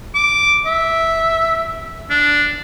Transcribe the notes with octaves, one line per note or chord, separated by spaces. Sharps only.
D6
E5
D4